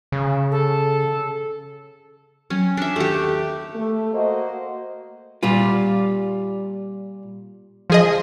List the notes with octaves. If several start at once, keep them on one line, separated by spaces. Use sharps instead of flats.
C#3
A4
F#3 C#4 G5
D4 E5
D#2 D#3 A3 G4
A3
A#3 F#4 C5 D#5
A#2 G3 F4
F3 G#4 D#5